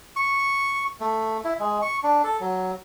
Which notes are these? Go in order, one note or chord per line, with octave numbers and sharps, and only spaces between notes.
C#6
A3
E4
G#3
C#6
D4
A4
F#3